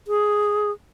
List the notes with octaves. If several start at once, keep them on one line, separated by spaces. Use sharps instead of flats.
G#4